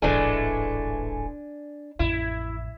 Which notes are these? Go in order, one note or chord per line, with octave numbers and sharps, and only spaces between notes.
D1 G#1 E3 G#3 A3 D4 D5 G#5
A1 F2 E4